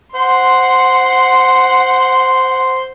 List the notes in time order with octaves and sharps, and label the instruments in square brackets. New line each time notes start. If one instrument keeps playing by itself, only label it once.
[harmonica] C5 [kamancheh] F#5 C6